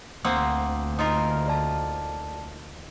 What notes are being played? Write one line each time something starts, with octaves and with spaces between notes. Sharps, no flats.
D2 A#3 C4 F#5 D#6
D#4 F4 A#4
A4 D5 A5